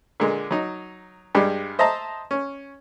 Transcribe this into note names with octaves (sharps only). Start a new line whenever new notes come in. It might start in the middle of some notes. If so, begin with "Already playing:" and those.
A#2 D3 G#3
F#3 D#4
G2 G3 G#3
C5 D#5 E5 A5 A#5 C6
C#4